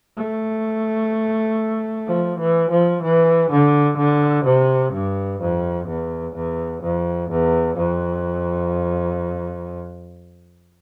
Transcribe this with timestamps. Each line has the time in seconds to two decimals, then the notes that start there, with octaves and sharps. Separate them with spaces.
0.17 A3
2.07 F3
2.39 E3
2.71 F3
3.03 E3
3.50 D3
3.97 D3
4.45 C3
4.93 G2
5.40 F2
5.87 E2
6.35 E2
6.82 F2
7.30 E2
7.77 F2